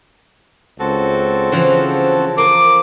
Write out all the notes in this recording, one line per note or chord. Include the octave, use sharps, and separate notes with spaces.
C#2 C4 F#4 A4
C#3 E3 F3
A#3 D6